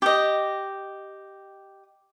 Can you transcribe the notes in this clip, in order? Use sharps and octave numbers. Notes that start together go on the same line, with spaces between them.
G4 D#5